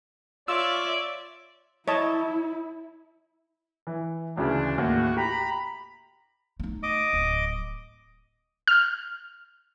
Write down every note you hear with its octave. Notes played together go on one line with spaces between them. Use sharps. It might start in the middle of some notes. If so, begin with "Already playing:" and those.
F4 C#5 D5 E5 E6
E4 C#5 D#5 A5
E3
D2 C#3 E3 D4
D#2 A2 F#4
G4 A#5 B5
A3 D#4
D#5 D6
D1
F6